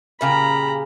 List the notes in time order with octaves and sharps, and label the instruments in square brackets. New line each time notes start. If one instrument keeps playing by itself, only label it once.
[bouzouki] A#2 C#3 G4 [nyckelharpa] A#5 B5